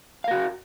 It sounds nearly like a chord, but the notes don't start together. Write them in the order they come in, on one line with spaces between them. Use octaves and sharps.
F5 A#4 F#4